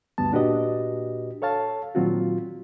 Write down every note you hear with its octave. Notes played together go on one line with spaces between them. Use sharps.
D2 G2 B3 A5
A#2 D4 F#4 G4 B4 D#5
A4 C#5 F5 A5
A#2 D#3 F#3 C4 F4 F#4